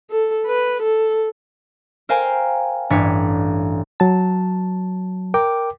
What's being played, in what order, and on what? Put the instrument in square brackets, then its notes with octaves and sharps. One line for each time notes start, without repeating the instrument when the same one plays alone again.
[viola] A4
B4
A4
[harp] A#4 C5 F5 G5 G#5 A#5
A1 G2 D4 C#5 B6 C#7
[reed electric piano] F#3 A5
A#4 G5 D6